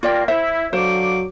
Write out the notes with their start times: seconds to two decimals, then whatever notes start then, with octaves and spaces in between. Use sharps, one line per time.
0.03 A#3 F4 D5 G5
0.28 E4 C5 E5
0.73 D3 F#3 C5 F5 D6